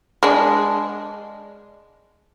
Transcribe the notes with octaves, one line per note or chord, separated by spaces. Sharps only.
G#3 D4